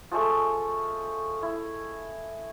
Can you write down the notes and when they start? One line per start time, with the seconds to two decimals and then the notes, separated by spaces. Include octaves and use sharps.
0.11 F3 G#3 A3
1.43 E4